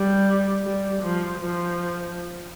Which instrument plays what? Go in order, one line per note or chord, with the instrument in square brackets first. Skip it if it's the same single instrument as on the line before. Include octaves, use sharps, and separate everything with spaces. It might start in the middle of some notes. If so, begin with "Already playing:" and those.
Already playing: [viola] G3
G3
F3
F3